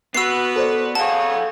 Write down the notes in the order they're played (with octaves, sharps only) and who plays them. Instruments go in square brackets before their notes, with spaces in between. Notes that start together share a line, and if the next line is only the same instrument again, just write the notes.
[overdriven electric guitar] B3 [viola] F#4 B4 [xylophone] E6 C7
[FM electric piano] A4 C5 D5
[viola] G#4 C#5 [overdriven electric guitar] A4 F5 [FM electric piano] F#5 [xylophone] A5